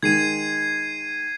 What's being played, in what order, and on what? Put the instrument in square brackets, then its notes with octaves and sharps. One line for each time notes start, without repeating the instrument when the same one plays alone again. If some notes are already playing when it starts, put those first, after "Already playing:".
[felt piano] D#3 G#3 [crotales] G#6 C7 D#7